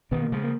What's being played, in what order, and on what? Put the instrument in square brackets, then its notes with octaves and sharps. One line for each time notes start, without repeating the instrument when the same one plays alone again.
[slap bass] B2 D#3 [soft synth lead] B3
[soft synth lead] A#3
[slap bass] C#3 F3 [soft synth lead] G#3
[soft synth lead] A#3